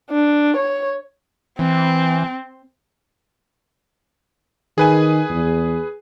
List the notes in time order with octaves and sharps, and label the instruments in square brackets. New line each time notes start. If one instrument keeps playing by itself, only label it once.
[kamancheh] D4
C#5
[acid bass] E3 [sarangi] C4
[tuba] D#3 [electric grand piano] G#4 B4 G#5
[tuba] E2